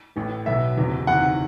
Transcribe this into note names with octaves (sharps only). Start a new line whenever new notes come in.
A1 A2 E3
B1 B2 E5
F#1 E2 C3 E3
F#1 E2 C3 D#3 F#5